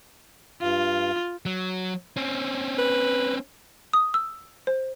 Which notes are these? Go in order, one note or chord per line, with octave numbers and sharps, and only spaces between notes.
G2 F4 F5
F#3
C4 C#4
B4
D#6
E6
C5